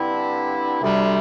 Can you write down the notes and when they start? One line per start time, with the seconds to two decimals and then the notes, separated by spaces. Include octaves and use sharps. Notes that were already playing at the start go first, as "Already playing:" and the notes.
Already playing: G2 D3 C4 E4
0.80 D2 C3 G3